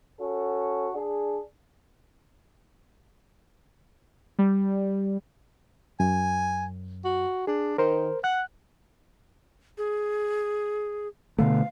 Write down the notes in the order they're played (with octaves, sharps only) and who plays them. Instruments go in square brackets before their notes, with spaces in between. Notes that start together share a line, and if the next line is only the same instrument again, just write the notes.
[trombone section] C#4 F#4 A4
D4 G#4
[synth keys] G3
[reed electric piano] F#2 [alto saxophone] G#5
[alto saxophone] F#4
[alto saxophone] D4 [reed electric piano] G#4
[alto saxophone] D#3 [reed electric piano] A#4 C5
[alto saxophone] F#5 [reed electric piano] F#6
[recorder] G#4
[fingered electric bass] B2 D3 A3 [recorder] F5